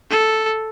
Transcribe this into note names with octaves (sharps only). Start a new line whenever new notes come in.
A4